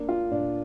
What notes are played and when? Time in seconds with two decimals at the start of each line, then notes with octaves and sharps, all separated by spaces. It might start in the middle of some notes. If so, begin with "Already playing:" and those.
Already playing: A#3 D4
0.09 F4
0.31 A#2 D4